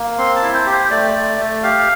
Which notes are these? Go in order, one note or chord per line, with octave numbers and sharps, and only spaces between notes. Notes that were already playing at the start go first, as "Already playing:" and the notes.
Already playing: A#3
C4 C6
A5
E4
C5
G4
C5
A3 D5
A3
A3
G4 F5